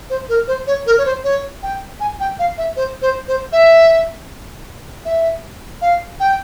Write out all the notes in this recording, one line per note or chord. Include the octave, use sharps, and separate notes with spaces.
C5
A#4
C5
C#5
A#4
C#5
C5
C#5
G5
G#5
G5
F5
E5
C5
C5
C5
E5
E5
F5
G5